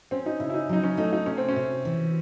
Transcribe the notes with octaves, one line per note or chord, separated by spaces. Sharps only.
C4 C#4
D#4
C#3 E4
E4
D#4
F#3 D#4
C#4
A3 D#4
D#4
C3 C#4
C4
C#4
C3
E3